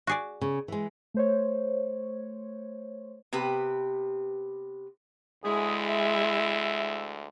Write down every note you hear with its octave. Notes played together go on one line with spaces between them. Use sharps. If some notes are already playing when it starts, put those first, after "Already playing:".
F#4 G#4 D5
C#3
E3 G#3
A3 C5 C#5
C3 B3 G4 B4
D2 G#3 E4 G#4
E5